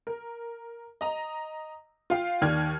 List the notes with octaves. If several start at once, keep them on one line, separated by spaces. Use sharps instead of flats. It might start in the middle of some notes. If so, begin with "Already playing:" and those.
A#4
D#5 A#5
F4 F5 G5
D#2 D#3 D5 F6 G#6